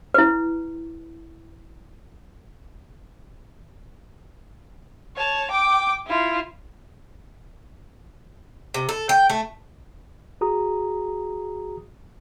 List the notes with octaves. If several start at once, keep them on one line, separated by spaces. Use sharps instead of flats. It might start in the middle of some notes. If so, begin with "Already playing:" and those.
E4 B4
C#5 A5
G5 D6
E4 F4
C3
A4
G5
A3
F#4 G#4 A#5 D#6